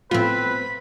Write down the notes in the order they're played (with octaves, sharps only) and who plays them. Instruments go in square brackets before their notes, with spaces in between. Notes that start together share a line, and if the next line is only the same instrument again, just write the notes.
[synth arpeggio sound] A2 F3 F4 [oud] B3 C4 [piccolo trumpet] B4 [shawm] B5